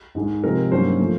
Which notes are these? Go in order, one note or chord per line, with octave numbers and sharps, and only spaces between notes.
G#2 D#3 G#3
C3 F3 G#3 C4 A#4
G2 D#3 F#3 A#3 C#4 C5
F3 A3